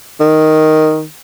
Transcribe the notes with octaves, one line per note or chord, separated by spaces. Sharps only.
D#3